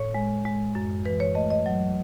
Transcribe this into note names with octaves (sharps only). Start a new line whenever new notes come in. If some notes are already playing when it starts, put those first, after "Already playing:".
Already playing: A2 C#5
G#3
G#3
F#2
E3 B4
C#5
A3 D#5
D#5
F#3